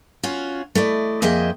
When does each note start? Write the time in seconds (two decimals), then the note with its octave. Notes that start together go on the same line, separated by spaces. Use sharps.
0.23 C#4 F4 F#4
0.75 A3 E4 D5 D#5
1.22 F2 A#3 G#4 D#5 E5 G5